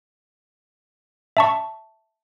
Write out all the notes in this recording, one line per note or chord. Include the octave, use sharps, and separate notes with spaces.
E5 A5 C#6